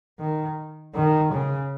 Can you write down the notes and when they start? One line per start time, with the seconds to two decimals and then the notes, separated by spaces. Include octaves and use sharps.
0.19 D#3
0.95 D#3
1.32 C#3